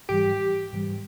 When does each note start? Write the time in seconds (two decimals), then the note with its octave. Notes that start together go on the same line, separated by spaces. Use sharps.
0.09 G#2 E3 G3 G4
0.73 G#2 E3 G3